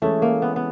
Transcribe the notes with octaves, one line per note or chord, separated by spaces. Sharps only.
E3 G#3 A3 C#4 E4 A4
A#3
B3
B3